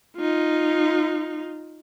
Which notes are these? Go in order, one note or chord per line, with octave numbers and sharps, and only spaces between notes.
D#4 F4